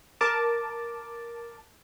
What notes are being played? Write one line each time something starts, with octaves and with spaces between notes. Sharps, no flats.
A#4 A5 D6